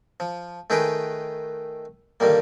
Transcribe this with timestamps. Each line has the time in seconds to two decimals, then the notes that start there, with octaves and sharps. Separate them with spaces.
0.20 F3
0.70 D#3 A3 D#4 G#4 B4 G5
2.20 G2 D3 D#3 G3 A#3